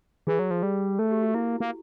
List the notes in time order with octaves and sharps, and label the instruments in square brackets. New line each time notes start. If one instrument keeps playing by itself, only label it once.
[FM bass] E3 [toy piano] G#4
[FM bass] F#3
F3
G3
[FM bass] A3 [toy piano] A4
[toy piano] G4
F#4
[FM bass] A#3 [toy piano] E4
[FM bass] A#3